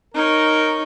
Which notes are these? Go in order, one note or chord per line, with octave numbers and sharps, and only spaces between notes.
D#4 A#4 C#5